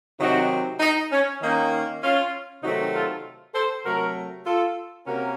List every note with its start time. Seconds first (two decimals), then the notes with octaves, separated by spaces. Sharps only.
0.19 C3 D#3 F#3 C4 D#4 F#4
0.80 D#4
1.11 C#4
1.41 D#3 A#3 C#4 D#4
2.02 C#4 F4
2.62 C3 D#3 F#3 A3 C4 D#4 F#4
2.93 F4 A4
3.53 A4 C5
3.84 C3 F#3 A3 F#4 A#4
4.45 F4 A4
5.06 C3 A#3 C#4 F#4 A#4